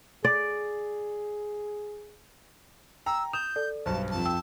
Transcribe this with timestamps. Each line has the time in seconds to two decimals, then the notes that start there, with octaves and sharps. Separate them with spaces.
0.25 G#4 D5
3.06 G5 A#5 E6
3.33 D#6 G6 E7 F7
3.56 A4 D5
3.86 B1 G2 C5 A5
4.11 F2 A5
4.26 G5 E6